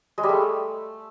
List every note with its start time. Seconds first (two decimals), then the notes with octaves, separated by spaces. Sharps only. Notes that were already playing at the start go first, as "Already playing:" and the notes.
0.18 G#3
0.23 G3
0.29 A3